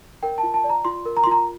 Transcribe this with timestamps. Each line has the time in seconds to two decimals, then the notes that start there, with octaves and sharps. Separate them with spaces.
0.23 A#4 G5
0.38 A5
0.43 F4
0.54 A5
0.64 D5
0.69 A#5
0.85 F4 C6
1.05 A#4
1.17 A#5
1.24 C6
1.27 F4 A#5